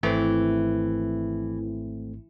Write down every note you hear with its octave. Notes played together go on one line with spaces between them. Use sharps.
G#1 E3 A3 C4